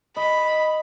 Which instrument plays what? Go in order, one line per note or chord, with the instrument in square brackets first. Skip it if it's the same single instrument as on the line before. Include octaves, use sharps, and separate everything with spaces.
[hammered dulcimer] D#5 [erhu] B5